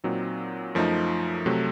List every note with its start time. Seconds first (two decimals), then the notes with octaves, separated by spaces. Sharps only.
0.04 A#2 F#3 C4 D#4
0.75 F#2 F3 A3 D#4
1.46 C3 F#3 A3